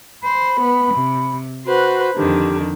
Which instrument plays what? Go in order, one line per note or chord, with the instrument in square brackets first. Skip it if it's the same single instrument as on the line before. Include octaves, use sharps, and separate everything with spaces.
[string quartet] C5 [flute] B5
[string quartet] B3
C3
[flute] F#4 [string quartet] B4 C5
[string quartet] F2 D3 D#3 [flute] G4